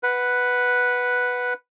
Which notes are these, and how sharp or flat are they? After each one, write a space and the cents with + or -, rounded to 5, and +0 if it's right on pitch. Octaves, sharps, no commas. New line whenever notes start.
B4 +0 F#5 +0